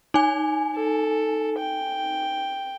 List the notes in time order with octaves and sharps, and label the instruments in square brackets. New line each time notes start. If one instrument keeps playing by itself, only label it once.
[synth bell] D#4 G#5
[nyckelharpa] A4
G5